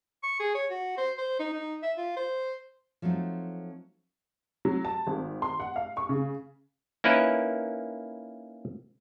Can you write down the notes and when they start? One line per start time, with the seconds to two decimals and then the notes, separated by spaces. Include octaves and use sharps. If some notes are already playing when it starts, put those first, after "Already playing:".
0.24 C#6
0.40 G#4
0.55 C#5
0.71 F#4
0.98 C5
1.18 C5
1.40 D#4
1.53 D#4
1.83 E5
1.97 F4
2.17 C5
3.02 F3 F#3 A3 C4 D#4
4.65 F#3
4.85 A5
5.07 G#1
5.42 C6
5.60 F#5
5.76 F5
5.97 C#6
6.09 C#3
7.04 A#3 C#4 D#4 E4 A#4 B4